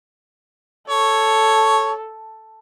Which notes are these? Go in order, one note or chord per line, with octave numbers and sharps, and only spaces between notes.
A4 C#5